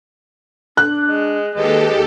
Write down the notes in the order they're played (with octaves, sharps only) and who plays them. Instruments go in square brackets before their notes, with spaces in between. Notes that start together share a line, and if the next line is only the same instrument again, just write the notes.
[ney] D4 [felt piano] F#6
[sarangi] G#3
[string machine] D#2 G4 A4 [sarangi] G#3 [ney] B4